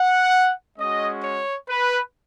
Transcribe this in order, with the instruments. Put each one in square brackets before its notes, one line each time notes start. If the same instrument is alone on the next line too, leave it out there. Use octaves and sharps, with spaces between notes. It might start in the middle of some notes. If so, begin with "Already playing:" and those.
Already playing: [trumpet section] F#5
G#3 C#4 F#4 D#5
C#5
B4